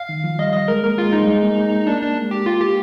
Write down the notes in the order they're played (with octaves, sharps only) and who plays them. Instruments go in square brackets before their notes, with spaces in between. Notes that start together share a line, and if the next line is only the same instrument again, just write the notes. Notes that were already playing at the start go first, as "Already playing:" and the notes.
Already playing: [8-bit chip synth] F5
[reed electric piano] D#3
F3
[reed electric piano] G3 [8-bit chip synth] D#5
[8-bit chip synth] D#5
[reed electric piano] G#3 [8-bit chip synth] A#4
[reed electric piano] A#3 [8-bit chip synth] A#4
[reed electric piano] G#3 [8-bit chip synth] F4
[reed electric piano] G#3 [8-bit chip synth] D#4
[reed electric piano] G3
G#3
A#3
G#3
[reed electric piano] A#3 [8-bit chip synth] D4
[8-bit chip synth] D4
[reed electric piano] G#3
[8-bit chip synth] G4
F4
G4